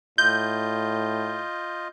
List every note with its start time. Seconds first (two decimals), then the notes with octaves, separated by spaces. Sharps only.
0.18 A2 F4 D#5 G6